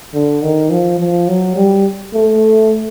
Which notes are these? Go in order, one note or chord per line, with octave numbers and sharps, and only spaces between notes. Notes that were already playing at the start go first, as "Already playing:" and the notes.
D3
D#3
F3
F3
F#3
G3
A3